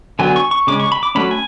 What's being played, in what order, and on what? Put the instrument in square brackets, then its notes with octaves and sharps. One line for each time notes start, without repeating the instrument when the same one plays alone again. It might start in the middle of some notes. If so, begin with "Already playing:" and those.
[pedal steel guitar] D3 F#3 B3 G#5
C#6
C#6
C#3 G#3 C#4 D6
C#6
B5
D6
F#3 A3 C#4 B5
G#5